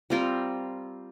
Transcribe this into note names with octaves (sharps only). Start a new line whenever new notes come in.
G3 C4 F4 A#4